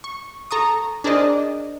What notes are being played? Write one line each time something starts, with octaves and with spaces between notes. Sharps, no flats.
C#6
A4 A#5 C#6 D#6
D4 G#4 A#4 C5 D5 D#5